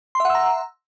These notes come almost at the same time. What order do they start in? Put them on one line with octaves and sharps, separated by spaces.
C6 E5 F#5 E6 A#5